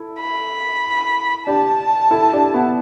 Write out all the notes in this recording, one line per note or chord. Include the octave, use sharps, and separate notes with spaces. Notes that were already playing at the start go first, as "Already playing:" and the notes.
Already playing: E4 A4
B5
D4 G4 A5
E4 A4
D4 G4
B3 E4